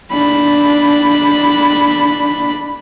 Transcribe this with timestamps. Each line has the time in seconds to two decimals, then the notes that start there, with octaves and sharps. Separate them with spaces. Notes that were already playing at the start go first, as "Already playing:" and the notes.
0.11 D4 B5